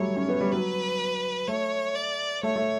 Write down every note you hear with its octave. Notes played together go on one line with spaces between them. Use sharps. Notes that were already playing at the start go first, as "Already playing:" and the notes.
Already playing: F#3 G3 A3 C#5
C#4
B3
G3
F#3 B4
A3 C#5
D5
A3 C#5
A3